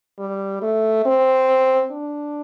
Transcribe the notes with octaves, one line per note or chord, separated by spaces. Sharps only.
G3
A3
C4
D4